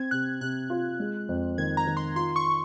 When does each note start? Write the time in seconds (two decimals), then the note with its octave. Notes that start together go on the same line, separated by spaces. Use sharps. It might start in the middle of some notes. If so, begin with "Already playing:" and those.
Already playing: C4 G#6
0.11 C3 F#6
0.41 C3 F#6
0.70 F4
1.00 G#3
1.29 F2
1.58 D#3 G#6
1.77 A#5
1.87 D#3
1.97 C6
2.16 F4 C6
2.36 C#6